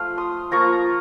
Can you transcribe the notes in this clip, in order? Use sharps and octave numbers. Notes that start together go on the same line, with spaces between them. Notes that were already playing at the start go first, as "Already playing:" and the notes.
Already playing: F3 A3 F4 F5
C6 D#6
F3 A#3 F4 A#5 C#6